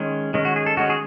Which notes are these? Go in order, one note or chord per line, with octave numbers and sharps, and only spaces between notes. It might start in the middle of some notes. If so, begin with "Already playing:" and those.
Already playing: D#3 G#3 C#4
D#3 G#3 C#4
F#4
G#4
A4
D#3 G#3 C#4 F#4
G#4